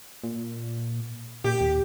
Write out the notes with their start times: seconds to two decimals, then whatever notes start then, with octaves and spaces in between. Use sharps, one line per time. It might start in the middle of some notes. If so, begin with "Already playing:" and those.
0.24 A#2
1.44 A#2 G4
1.61 D#2